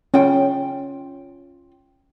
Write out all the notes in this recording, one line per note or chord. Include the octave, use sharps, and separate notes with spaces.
C#4 F4 G5